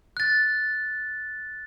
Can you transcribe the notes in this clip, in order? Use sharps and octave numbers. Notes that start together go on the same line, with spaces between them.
F#6 A6